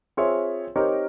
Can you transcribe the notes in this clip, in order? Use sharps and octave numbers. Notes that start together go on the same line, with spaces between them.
C4 F4 G#4 C#5 E5
C4 D#4 G4 A#4 C#5